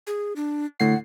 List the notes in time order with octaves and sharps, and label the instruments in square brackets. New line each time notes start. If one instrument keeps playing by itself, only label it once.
[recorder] G#4
D4
[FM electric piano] D2 A2 C7 [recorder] F#5